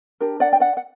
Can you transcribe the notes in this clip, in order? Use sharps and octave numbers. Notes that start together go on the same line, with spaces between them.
D4 G4 A#4
D5 F#5
G5
D5 F#5
F#5